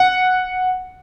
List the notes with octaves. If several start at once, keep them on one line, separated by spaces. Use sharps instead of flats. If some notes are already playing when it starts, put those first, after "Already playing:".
Already playing: F#5